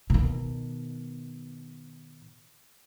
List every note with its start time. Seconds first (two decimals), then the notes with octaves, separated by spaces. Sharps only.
0.10 B2 D#3